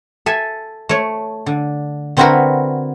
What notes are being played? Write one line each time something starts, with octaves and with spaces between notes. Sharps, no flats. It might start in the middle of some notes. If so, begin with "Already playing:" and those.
A4 E5 G#5
A3 C#5
D3
D3 C4 E4 F#4 A#4 B4